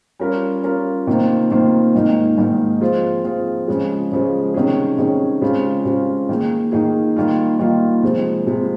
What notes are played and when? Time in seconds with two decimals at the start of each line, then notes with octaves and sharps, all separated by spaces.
0.20 G3 C#4 F4 A#4
0.63 G3 C#4 F4 A#4
1.07 C3 D#3 A#3 F4 C5
1.50 C3 D#3 A#3 F4 C5
1.95 G#2 D#3 A#3 D#4
2.38 G#2 D#3 A#3 D#4
2.81 F3 C4 F4 G#4
3.24 F3 C4 F4 G#4
3.68 C#3 F3 G#3
4.12 C#3 F3 G#3
4.54 C3 D#3 G3 C#4 G#4
4.98 C3 D#3 G3 C#4 G#4
5.41 C#3 G#3 C4 F4
5.85 C#3 G#3 C4 F4
6.29 D#3 A#3 D#4 G#4
6.72 D#3 A#3 D#4 G#4
7.16 D#3 G3 A#3 F4
7.59 D#3 G3 A#3 F4
8.02 C3 F3 G#3
8.47 C3 F3 G#3